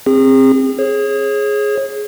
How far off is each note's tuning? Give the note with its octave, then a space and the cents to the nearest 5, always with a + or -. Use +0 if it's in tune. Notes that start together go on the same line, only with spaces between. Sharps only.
C4 +15 G#4 -35
G#4 +5 C#5 -35